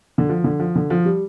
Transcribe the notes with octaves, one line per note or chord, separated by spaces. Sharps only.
D3
F3
D3
F3
D3
F3
G3